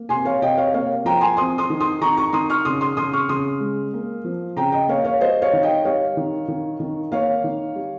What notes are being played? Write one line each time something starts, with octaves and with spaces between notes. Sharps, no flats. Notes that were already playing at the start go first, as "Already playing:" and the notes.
Already playing: A#3
C3 G#5 C6
C#5 F5
C3 D#5 G5
C#5 F5
A#3 C#5 F5
F3 G5 A#5
G#5 C6
C4 C6 D#6
C6 D#6
D#3
C6 D#6
D#3 A#5 C#6
A#5 C#6
D#3 C6 D#6
C#6 F6
C#3 C6 D#6
C6 D#6
C#3 C6 D#6
C#6 F6
C#3 C6 D#6
G#3
A#3
F3
C#3 G5 A#5
D#5 G5
A#3 C#5 F5
C#5 F5
G3 C5 D#5
C#5 F5
D#3
D#5 G5
G3 C#5 F5
D#3
D#3
D#3
A#3 C#5 F5
D#3
G3